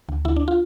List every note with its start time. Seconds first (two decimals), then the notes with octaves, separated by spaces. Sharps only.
0.09 D2
0.25 D2 E4
0.36 D4
0.48 F4